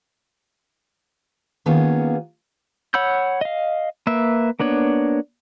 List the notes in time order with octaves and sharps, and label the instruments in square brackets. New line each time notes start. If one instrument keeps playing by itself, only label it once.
[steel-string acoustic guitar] D#3 A#3 B3 C#4 F4 G#4
[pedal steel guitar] C#5 F#5 B5 E6 G6
D#5 F5
A#3 B4 E5
A#3 B3 D4 C#5